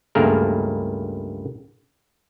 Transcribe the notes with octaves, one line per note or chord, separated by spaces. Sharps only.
C#2 G2 A3 A#3 G#4 A#4